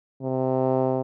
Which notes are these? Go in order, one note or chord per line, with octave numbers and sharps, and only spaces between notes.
C3